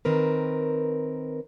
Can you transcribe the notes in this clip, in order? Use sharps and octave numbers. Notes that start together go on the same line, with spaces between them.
D#3 C4 A#4 B4